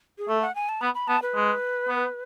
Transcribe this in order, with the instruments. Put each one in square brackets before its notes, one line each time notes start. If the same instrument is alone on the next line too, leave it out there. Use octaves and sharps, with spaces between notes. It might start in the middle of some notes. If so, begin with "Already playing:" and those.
[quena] G#4
[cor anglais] A3 [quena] A4
[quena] F#5
G#5
A5
[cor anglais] B3 [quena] B5
[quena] B5
[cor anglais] B3 [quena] A5
[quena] B4
[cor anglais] G#3
B3